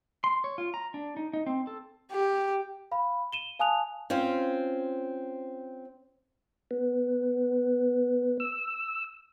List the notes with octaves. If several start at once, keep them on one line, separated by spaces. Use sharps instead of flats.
C6
C#5
F4
A#5
D4
D#4
D#4
C4
A4
G4
F5 B5
D#7 E7 G7
F5 G#5 A5 D#6 F#6 F7
C4 C#4 F4 C5
B3
E6